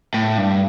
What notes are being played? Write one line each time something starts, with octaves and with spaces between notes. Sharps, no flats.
A2
G2